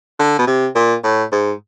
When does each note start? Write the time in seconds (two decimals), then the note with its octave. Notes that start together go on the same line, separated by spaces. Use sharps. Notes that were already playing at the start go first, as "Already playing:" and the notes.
0.20 D3
0.38 B2
0.47 C3
0.75 A#2
1.04 A2
1.32 G#2